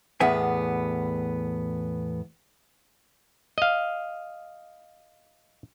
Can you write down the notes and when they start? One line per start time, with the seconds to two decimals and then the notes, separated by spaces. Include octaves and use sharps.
0.20 E2 A2 B3 E5 G#5
3.58 D#5 F5